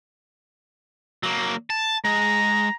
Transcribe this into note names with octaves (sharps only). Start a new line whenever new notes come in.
F#3 A#3
A5
G#3 A#5